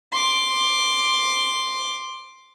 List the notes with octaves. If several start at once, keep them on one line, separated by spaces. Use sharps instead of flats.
C6 D6